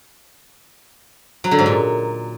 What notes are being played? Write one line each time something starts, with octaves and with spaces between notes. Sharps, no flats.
F#3
D3
G#2
A#2